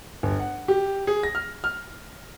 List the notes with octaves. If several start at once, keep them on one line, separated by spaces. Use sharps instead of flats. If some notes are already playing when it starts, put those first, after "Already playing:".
G1
F#5
G4
G#4
A#6
F6
F6